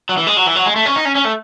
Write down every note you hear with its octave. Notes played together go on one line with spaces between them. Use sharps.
F#3
E3
G#3
F#3
E3
F#3
G#3
A3
C#4
D#4
C#4
C#4
A3